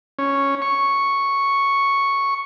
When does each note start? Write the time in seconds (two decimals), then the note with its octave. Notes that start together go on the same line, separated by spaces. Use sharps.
0.19 C#4
0.62 C#6